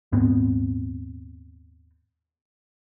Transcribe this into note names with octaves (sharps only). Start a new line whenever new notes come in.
D#1 G#2 B3 C4